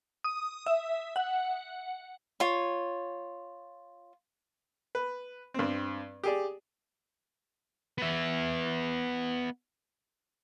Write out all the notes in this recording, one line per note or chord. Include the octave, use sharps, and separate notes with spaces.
D#6
E5
F#5
F4 C#5
B4
G2 C4
G4 G#4 D5
B3 E5